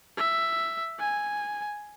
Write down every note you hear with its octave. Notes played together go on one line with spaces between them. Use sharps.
E5
G#5